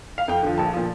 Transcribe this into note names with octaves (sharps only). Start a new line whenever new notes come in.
F5
F2 G5
D3 F3
A#1 A5
A#2 F3